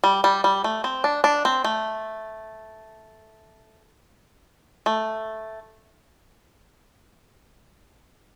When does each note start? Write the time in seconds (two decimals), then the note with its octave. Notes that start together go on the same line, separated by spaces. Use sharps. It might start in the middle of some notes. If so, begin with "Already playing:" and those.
0.04 G3
0.24 G3
0.44 G3
0.64 A3
0.84 C4
1.04 D4
1.24 D4
1.45 C4
1.64 A3
4.86 A3